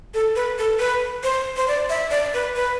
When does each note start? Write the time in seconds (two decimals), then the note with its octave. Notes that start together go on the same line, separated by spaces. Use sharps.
0.14 A4
0.36 B4
0.58 A4
0.79 B4
1.23 C5
1.57 C5
1.68 D5
1.89 E5
2.11 D5
2.34 B4
2.56 B4